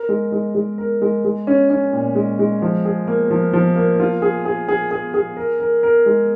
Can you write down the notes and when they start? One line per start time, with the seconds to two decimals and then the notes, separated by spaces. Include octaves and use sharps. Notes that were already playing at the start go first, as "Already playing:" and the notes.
Already playing: A#4
0.09 G#3
0.32 G#3
0.55 G#3
0.78 A#4
1.02 G#3
1.25 G#3
1.47 C#4
1.70 C#4
1.93 A#2
2.15 G#3
2.39 G#3
2.62 F3
2.85 G#4
3.07 A#3
3.31 F3
3.53 F3
3.76 A#3
4.00 F4
4.22 G#4
4.45 G#4
4.68 G#4
4.91 G#4
5.14 G#4
5.37 A#4
5.60 A#4
5.83 A#4
6.06 G#3